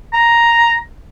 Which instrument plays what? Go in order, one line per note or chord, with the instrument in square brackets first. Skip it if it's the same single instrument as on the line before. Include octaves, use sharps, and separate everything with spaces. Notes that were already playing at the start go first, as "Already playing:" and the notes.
[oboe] A#5